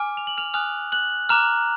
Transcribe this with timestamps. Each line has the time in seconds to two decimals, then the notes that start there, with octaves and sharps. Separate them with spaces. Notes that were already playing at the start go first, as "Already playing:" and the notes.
Already playing: G#5 D6 F6
0.17 F7
0.27 F#7
0.37 F6 F7
0.54 G#5 D#6 F6 F#6 F7
0.92 F#6 F#7
1.29 A#5 D6 F6 F#6 F7